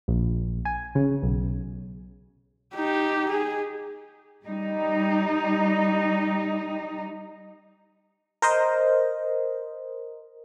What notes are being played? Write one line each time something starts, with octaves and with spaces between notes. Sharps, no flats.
A#1
G#5
C#3
B1
D#4 G4
G#4
G3 D#4
A#4 C5 D#5